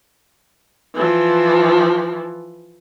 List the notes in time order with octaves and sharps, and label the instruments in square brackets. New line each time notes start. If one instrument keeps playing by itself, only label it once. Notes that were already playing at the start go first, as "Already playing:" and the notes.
[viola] E3 F3